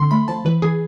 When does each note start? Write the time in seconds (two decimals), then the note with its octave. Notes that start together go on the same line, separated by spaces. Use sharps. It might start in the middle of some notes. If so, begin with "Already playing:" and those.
Already playing: D3 C4 C6
0.11 A3 B5
0.28 F3 A5
0.45 E3 B4
0.62 E3 G#4